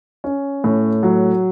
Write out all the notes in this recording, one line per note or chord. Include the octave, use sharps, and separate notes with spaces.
C#4
A2
F#3